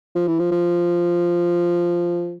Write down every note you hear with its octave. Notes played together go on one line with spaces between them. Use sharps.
F3
E3
F3
F3